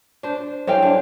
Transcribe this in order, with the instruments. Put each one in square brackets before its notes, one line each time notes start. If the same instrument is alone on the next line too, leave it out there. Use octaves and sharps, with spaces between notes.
[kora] D4 C5
[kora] A2 G4 F5 [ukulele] C5 G5 G#5
[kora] D3 D4